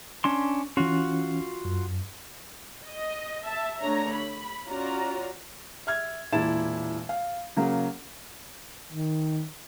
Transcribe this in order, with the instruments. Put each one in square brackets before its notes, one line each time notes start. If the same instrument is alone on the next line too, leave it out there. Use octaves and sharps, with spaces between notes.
[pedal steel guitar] C#4 D4 C6
[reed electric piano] E3 C#4 [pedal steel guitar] F4 F#4
[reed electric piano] F#2
[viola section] D#5
E5 A5
D3 A3 D4 C#5 A#5
B5
C#4 F4 F#4 D5 A#5
[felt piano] E5 F6 G#6
E1 A#2 E4 A5 A6 E7
F5
C#3 F#3 A#3
[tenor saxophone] D#3